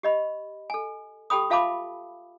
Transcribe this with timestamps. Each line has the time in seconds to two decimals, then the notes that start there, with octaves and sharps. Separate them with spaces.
0.03 G4 D#5 B5
0.70 A4 G#5
1.30 G4 A4 G5 B5 D#6
1.50 F4 E5 F5 A5 B5 D6